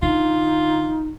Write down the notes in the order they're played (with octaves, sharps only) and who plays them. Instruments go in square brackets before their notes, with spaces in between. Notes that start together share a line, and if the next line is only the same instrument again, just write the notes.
[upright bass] D3 [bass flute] D#4 [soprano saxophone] F4